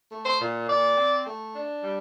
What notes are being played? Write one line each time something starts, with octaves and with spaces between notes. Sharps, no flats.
A3
C5
A#2
A#2 D5
C4
A3
D4
G3